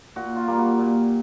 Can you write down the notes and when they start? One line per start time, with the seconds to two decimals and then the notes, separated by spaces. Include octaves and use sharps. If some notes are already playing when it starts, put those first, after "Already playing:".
0.16 A#2 F#4
0.36 F4
0.48 G3 A#3
0.58 F#4
0.79 A#2